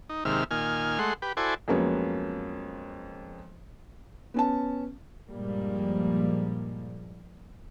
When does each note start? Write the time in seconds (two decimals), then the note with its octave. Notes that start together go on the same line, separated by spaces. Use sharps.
0.09 D#4
0.25 D#2 G#2 C3 E5 F6
0.51 A#2 D#3 G#5 F6
0.99 G#3 A3 F#5 C6
1.22 G4 B4
1.37 E4 F#4 A4 C5 D5 G#5
1.68 F2 F#3 G#3 A#3 B3 C#4
4.34 B3 C#4 A5
5.29 G2 A#2 F3 G3 G#3 A#3